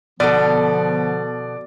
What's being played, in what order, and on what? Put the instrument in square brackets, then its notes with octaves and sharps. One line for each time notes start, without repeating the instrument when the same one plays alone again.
[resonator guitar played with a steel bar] B2 A4 [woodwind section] D3 F3 B3 [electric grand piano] D5